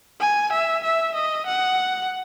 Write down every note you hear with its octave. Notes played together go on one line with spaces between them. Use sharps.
G#5
E5
E5
D#5
F#5